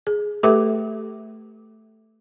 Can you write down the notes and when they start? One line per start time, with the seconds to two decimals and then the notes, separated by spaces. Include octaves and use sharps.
0.07 G#4
0.43 A3 G4 A4 B4 E5 D6